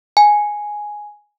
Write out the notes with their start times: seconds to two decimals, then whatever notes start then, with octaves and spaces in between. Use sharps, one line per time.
0.17 G#5